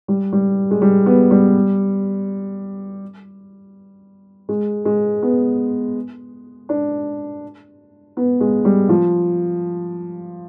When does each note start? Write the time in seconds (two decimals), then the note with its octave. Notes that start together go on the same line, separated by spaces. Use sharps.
0.08 G3
0.33 G3
0.71 G#3
0.82 G3
1.06 B3
1.31 G3
4.49 G#3
4.85 G#3
5.22 B3
6.69 D4
8.17 B3
8.41 G#3
8.65 G3
8.89 F3